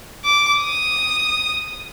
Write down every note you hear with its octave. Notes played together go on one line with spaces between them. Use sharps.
D6
D#6